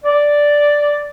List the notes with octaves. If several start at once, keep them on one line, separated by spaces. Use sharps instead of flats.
D5